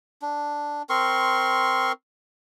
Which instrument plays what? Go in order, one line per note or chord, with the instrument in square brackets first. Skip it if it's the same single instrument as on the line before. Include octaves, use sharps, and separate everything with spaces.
[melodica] D4
C4 A#4 C6 C#6